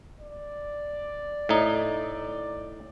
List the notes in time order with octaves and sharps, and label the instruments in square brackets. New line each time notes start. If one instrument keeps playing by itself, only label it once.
[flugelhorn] D5
[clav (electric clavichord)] A2 D#4